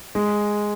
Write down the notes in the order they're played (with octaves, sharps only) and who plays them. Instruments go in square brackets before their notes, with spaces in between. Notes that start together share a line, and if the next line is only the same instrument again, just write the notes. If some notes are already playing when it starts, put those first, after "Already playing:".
[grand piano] G#3